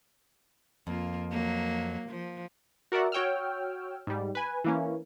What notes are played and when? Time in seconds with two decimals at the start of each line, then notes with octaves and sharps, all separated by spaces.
0.87 F2 A#3 F4
1.31 F#3 A#3
2.08 F3
2.92 F#4 A#4 D5 E5 F#5
3.12 F#4 C#5 G5 E6 F6
4.07 G#2 G3
4.35 B4 G#5
4.64 E3 A#3 C#4